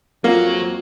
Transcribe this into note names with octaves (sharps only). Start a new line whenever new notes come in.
F2 F#3 A#3 F4